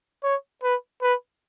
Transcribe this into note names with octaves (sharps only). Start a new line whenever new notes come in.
C#5
B4
B4